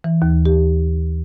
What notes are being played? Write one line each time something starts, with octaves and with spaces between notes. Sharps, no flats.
E3
D#2
G4